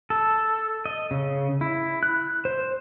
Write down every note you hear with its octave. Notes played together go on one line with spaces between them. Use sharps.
A4
D#5
C#3
E4
F#6
C5